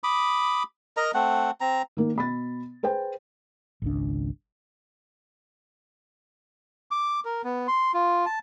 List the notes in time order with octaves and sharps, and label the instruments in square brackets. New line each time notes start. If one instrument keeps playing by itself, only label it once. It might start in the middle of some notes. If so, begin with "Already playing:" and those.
[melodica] B5 D6 D#6
A#4 D#5 A#5
A3 C4 F#5
C4 A#5
[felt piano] D#3 A#3
B2 B5 A6
G#4 B4 C5 G5
[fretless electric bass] G#1 C#2 D4
[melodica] D6
A#4
B3
C6
F4
A5